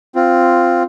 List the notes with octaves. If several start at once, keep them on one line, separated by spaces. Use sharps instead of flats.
C4 F4